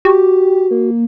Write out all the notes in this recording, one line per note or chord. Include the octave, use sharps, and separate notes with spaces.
F#4 G4
A#3